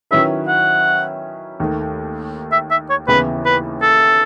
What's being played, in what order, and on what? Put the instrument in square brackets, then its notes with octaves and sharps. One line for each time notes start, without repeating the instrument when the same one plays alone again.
[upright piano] D#3 F#3 C#4 E4 B4 [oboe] E5
[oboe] F#5
[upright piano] D#2 D#3 A3
[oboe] E5
E5
C#5
[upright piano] D#2 C#3 E3 B3 E4 [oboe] B4
[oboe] B4
A4